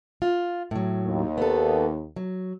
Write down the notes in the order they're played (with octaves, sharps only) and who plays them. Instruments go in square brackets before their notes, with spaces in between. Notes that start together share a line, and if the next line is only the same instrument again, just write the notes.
[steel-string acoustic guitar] F4
A2 F#3
[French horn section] D#2
[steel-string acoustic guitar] B3 A4
F#3